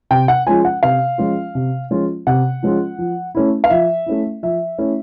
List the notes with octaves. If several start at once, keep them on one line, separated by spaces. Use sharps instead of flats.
C3 G5
F#5
F3 G#3 C#4 F4 G#5
F#5
C3 F5
F3 G#3 C#4 F4
C3
F3 G#3 C#4 F4
C3 F#5
F3 G#3 C#4 F4
F3
A3 C#4 E4
F5
F3 E5
A3 C#4 E4
F3 E5
A3 C#4 E4